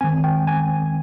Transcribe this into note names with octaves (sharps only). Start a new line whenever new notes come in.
D#3 G#3 C4 G#5
G5
G#5